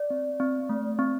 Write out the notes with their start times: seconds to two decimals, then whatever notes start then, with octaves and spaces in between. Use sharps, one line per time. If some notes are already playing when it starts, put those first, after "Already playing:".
Already playing: D5
0.10 C4
0.40 C4
0.69 A3
0.99 C4